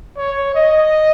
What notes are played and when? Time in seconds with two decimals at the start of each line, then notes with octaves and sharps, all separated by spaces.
0.17 C#5
0.55 D#5